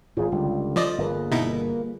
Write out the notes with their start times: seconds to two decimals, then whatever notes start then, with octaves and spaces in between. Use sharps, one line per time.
0.17 G#1 G#2 F4 G#4
0.32 C#2 D3 G3
0.76 F3 D5 D#5
0.98 G1 G3 A#3 G#4 B4
1.32 B2 D#4 E4